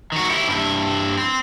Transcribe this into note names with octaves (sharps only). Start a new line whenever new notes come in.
D#3 F#4
E4 G4
G2 E4
C4